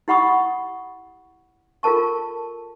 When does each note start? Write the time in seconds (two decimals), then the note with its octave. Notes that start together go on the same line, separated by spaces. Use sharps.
0.08 E4 G4 F#5 B5 C#6 D#6
1.83 F4 A4 A#4 A5 C#6